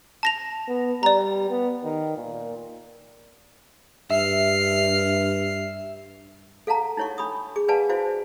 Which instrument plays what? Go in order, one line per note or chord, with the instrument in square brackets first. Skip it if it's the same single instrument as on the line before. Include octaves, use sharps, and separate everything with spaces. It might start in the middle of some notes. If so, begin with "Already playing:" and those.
[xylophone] A5 A#6 F7
[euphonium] B3
[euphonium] G3 [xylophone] D5 A#5
[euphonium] B3
D#3
A#2
[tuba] G2 [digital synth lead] E5 [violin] F6 C7
[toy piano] A4 F5 F#5 A5 A#5
D#4 E4 C#5 F#5 C#6
D4 B5 C#6 D#6
G#4 D6
B4 D5 F5 F#5 G#5 A5
E4 F#4 C5 D5 F5